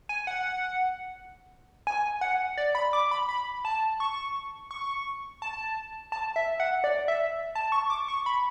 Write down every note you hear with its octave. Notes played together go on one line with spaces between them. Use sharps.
G#5
F#5
G#5
F#5
D5
B5
D6
B5
B5
A5
C#6
C#6
A5
A5
E5
F#5
D5
E5
A5
C#6
D6
C#6
B5